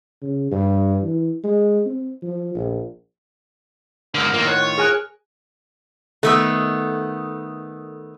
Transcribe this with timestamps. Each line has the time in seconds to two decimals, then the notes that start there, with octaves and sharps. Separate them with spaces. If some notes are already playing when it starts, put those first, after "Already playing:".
0.22 C#3
0.51 G2
1.03 E3
1.44 G#3
1.85 C4
2.22 F3
2.55 A#1
4.15 G#2 D3 A#4
4.34 F2 A2 D#3 A#3 F4
4.47 C#5 F#5
4.61 C#6
4.78 G#4 A#4 G#5 F#6
6.23 D#3 A3 B3 A4 D#6